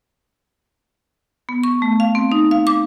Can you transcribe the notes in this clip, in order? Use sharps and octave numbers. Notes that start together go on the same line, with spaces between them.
B3
C#6
A3
F5
C4
D#4
F5
D6